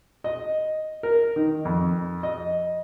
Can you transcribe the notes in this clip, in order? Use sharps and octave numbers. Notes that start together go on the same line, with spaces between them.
D#5
A#4
D#3
F2
D#5